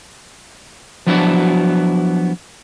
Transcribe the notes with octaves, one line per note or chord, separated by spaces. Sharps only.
F3 F#3 B3 D4 E4 F#4